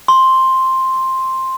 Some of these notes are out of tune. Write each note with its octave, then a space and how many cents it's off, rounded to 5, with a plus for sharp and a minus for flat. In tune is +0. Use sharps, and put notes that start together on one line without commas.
C6 +5